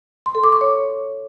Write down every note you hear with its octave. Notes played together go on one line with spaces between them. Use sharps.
C6
A4
D6
C#6
C#5